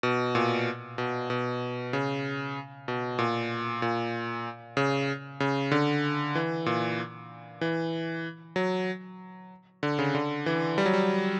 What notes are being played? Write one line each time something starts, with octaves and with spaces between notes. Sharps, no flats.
B2
A#2
B2
B2
C#3
B2
A#2
A#2
C#3
C#3
D3
E3
A#2
E3
F#3
D3
C#3
D3
E3
G3
F#3
G3